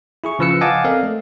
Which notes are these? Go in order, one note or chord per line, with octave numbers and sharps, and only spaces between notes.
E4 G#4 C#6
C#3 F3 B4 E6 C#7
D#5 F5 F#5 G#5 A5 D6
C4 A4 A#4 D5 F5
A3